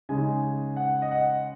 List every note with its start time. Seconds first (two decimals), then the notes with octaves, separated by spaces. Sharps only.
0.09 C#3 G#3 D#4 G#5
0.77 F#5
1.02 D#5
1.11 F#5